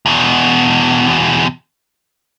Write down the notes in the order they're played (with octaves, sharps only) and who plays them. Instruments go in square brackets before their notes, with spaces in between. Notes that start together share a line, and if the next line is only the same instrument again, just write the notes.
[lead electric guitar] E2 B2